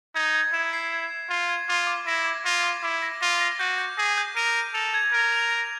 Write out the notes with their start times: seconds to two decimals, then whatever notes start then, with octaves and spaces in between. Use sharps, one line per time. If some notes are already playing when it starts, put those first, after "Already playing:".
0.15 D#4 G#6
0.34 G#6
0.53 E4 E7
0.73 C7
0.92 G#6
1.10 G#6
1.29 F4 C7
1.49 G#6
1.68 F4 D6
1.87 D6
2.06 E4 A#6
2.26 D6
2.45 F4 A#6
2.64 D6
2.82 E4 D6
3.02 A#6
3.21 F4 A#6
3.41 A#6
3.59 F#4 G6
3.78 G6
3.98 G#4 A#6
4.18 G6
4.36 A#4 D#7
4.56 D#7
4.74 A4 F7
4.94 G#6
5.13 A#4 G#6
5.32 F7
5.51 G#6